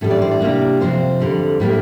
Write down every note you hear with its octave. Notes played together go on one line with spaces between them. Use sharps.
A2 E3 G3 D4 A4
D5
C5
D5
C3 G3 A#3 D4
F2 C3 F3 C4 C5
F2 D3 G3
A2 G3 A#3 D4